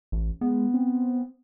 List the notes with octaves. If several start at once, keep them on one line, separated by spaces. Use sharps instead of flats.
A1
G#3 B3
C4